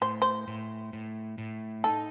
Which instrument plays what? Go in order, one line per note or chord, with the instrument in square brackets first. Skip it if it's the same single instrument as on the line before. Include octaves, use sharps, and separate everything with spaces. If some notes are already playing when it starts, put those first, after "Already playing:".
[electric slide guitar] A2 [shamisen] C5
[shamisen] C5
[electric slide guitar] A2
A2
A2
[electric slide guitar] D#4 [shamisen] A4